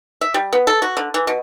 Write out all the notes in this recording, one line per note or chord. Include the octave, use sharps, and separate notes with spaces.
E5
G3
B3
A4
F#4
D3
E3
B2